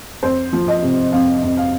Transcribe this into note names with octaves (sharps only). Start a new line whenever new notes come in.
F2 C5
F3
D#5
C3
F2 F5
F2
F5